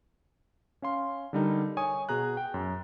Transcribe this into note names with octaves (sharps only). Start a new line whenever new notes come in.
C#4 F5 C6
D3 G3 D#4 A#4
C#5 G#5 C#6 D#6
B2 G#4 A#5 F#6
G5
F#2